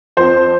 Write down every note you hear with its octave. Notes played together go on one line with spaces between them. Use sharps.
F2 F3 C4 C5